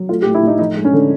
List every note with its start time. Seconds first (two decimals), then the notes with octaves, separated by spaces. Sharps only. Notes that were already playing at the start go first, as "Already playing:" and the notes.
Already playing: F#3
0.09 A3 F4
0.22 G4
0.26 A2
0.35 E4
0.43 A2 D#4
0.59 F3 D#4
0.76 G#3
0.85 C#4
0.93 D3